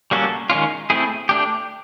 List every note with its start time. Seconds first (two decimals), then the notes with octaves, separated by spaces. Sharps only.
0.11 G3 A#3 C#4 F#4 A4
0.50 D#3 G#3 C#4 F4
0.90 A3 C4 E4 G#4
1.29 A3 D4 G4